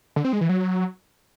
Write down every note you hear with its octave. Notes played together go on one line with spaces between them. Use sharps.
D3
C4
G#3
E3
F#3